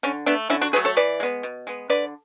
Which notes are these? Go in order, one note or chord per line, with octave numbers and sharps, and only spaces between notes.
D3 C#4
A3 B3 D4
D3 C#4 E4
D4 F#4
F#3 A3 G#4 B4
A4 C#5
E3 B4 D5
G#3 B3
B2
G#3 B3
D3 B4 D5